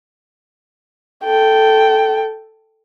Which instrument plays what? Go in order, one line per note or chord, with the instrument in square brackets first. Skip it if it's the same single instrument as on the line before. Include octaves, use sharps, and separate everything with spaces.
[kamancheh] A4 G5